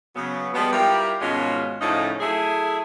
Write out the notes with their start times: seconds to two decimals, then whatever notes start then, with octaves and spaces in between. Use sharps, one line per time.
0.16 C#3 F#3 B3
0.55 F3 G3 G#3 B3
0.73 G3 E4 F4 G4 A#4
1.21 G#2 B2 D#3 G#3 C#4 F4
1.81 A2 C#3 F3 A3 C#4 D#4
2.21 F#3 A3 E4 G#4